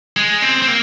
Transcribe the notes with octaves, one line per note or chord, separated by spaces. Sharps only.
G#3
C4
C4
A#3